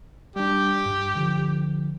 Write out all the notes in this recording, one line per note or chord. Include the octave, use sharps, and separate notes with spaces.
G3 D4 G4
G2
D3 F3